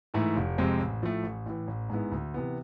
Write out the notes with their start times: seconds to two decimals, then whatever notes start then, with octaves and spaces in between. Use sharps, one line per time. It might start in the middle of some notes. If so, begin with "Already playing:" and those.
0.14 G#2 E3 A3 E4
0.36 F1
0.58 F2 C3 G#3 C4
0.80 A1
1.03 A2 F3 A3
1.23 A1
1.46 A2 E3
1.68 A1
1.89 G#2 G#3 B3 E4
2.12 D2
2.34 C3 E3 B3